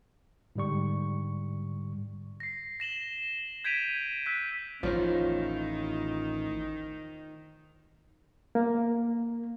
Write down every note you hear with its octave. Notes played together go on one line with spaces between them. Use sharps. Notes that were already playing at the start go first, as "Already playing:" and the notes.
G#2 D3 G3 C#6
A#6 C7
A#6 E7 F#7 G7
G6 G#6 B6 D7 D#7 F7
E6 F#6 B6
A1 E2 A2 D#3 F3 F4 C5 C#5
A#3